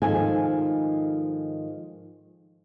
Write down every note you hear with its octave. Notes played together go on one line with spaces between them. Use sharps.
G#2 D#3 F3 G#4 A4 G#5